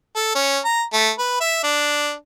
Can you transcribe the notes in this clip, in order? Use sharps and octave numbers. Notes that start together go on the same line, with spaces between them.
A4
C#4
A#5
A3
B4
E5
D4